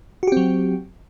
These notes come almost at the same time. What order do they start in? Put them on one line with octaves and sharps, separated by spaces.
F#4 G4 C4 F#3